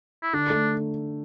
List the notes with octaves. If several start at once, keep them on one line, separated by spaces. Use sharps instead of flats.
E4
D3 D4
A3